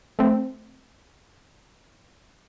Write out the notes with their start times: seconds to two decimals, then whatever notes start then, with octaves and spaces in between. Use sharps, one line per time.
0.19 A3 C4